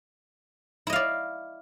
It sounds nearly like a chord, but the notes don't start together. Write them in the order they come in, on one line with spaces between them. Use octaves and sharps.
E4 D#5 F5 D5